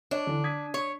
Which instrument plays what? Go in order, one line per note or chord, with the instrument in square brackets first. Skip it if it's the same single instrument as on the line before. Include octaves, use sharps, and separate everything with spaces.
[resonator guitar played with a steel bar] D4 [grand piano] C#5 D#5
[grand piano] D3 E3
D#6 G#6 B6
[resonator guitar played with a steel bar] C#5